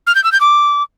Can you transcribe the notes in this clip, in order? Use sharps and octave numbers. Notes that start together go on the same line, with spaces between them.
F6
G6
E6
G6
D6